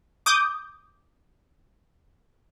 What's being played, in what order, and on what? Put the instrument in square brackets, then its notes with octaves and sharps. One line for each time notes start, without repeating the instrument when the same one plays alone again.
[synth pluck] D6 D#6 G6